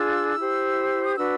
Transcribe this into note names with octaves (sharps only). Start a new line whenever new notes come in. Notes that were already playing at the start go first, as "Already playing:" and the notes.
Already playing: D4 F4 G#4 E6
E4 G4 C5
D#6
D4 F#4 B4 E6